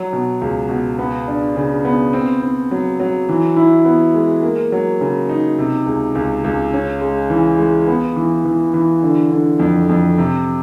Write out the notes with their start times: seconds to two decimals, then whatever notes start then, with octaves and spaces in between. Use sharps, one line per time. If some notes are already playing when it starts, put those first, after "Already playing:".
Already playing: F#3
0.13 B2
0.41 C#2
0.69 B2
0.99 B3
1.28 D4
1.56 C#3
1.85 B3
2.13 C4
2.42 C4
2.71 F#3
3.00 F#3
3.29 E3
3.56 E4
3.85 B3
4.14 G#3
4.43 A#3
4.72 F#3
5.01 C#3
5.29 D#4
5.58 C3
5.86 C#2
6.15 C#2
6.44 C#2
6.73 C#4
7.01 G#3
7.30 E3
7.58 G#3
7.87 B3
8.16 E3
8.45 E3
8.73 E3
9.03 D3
9.32 D3
9.59 F2
9.89 F2
10.18 C3